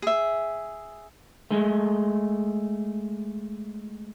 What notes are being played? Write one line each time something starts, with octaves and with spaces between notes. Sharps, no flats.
G#4 E5
G#3 A3